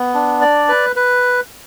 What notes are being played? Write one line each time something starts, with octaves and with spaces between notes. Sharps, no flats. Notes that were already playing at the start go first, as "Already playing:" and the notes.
Already playing: B3
D4
D5
B4
B4